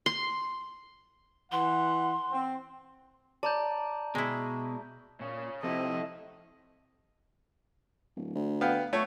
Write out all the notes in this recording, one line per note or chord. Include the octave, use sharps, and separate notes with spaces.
C6
E3 F#5 C6
C4
D5 A5 A#5 G6
B2 G#3 E4
A#2 C#3 C#4
C3 F3 C4 E4 A4 D#5
D1
D2
B3 F5 G5
A3 C#5